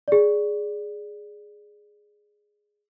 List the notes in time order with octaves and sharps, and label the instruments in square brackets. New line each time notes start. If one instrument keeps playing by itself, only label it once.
[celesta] G#4 D5